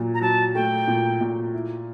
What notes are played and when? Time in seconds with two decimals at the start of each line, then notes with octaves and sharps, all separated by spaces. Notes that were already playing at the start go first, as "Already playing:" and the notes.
Already playing: A#2 F#3
0.14 A#5
0.21 F#3 A5
0.55 A3 G5
0.88 A#2
1.21 A#2
1.53 E4